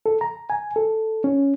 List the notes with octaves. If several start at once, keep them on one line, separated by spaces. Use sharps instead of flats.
A4
A#5
G#5
A4
C#4